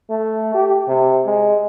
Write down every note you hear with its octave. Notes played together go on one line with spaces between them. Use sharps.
A3
G4
C3
G#3